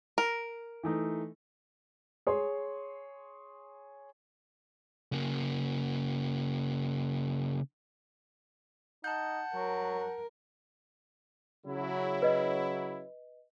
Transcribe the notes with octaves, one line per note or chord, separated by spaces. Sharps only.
A#4
E3 A3 D#4
G#4 C#5 C6
C#3 A#3
D#4 F#5 A5 G6
F#3 A#4
C#3 F#3 E4
B4 D#5